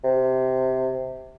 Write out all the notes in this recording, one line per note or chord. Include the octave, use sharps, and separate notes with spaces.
C3